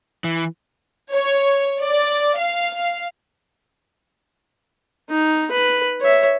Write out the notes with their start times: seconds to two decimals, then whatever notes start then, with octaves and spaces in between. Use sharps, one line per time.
0.24 E3
1.12 C#5
1.81 D5
2.38 F5
5.11 D#4
5.51 B4
6.01 C#5 E5